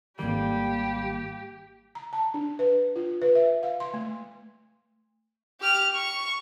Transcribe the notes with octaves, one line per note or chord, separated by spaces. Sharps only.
G#1 D#3 G3 A#3 G4
A#5
A5
D4
B4
F4
B4
E5
F5
C6
A3
G4 F6
C#6